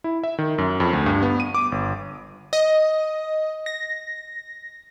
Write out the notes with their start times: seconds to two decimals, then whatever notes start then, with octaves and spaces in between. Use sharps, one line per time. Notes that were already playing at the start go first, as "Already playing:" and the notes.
0.04 E4
0.24 E5
0.38 D#3
0.58 F#2
0.80 F2
0.93 D2
1.06 G2
1.23 B3
1.40 D#7
1.54 D6
1.72 G1
2.53 D#5
3.66 A#6